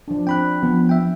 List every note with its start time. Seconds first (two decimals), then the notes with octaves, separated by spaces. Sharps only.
0.08 F3 D4
0.27 C4 G5 B5 F#6
0.63 F3 B3
0.89 E5 G5